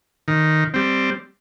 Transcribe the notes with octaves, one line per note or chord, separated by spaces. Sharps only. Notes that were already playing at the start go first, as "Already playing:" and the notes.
D#3
G3 C4